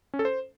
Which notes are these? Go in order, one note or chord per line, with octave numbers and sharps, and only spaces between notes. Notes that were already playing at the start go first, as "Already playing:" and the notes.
C#4
A4
C5